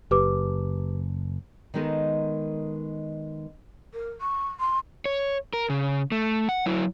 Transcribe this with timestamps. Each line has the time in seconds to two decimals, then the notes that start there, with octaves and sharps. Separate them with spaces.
0.11 F#1 G4 B4 D6
1.74 D#3 G#3 B3 D#4 A4 A#4
3.93 A#4
4.21 C#6
4.60 C6
5.05 C#5
5.53 A#4
5.70 C#3
6.12 A3
6.49 F#5
6.66 F#3 E4